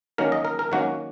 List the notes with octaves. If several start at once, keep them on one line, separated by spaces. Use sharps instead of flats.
D#3 F#3 A#3 C#4 A#4
D#5
A#4
A#4
D#3 F#3 A#3 C#4 F#4